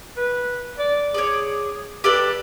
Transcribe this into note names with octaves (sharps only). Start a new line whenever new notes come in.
B4
D5
G#4 C#5 D5
G4 A4 B4 D5